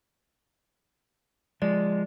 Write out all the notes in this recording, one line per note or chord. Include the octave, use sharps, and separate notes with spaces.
F3 G#3 D5